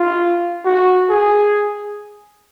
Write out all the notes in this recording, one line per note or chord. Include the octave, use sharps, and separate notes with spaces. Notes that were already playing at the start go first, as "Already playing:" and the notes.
Already playing: F4
F#4
G#4